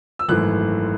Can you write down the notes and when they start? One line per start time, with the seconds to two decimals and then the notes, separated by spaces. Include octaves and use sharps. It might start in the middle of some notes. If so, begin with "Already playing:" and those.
0.19 E6
0.28 G#1 F#2 E3 A3 F#6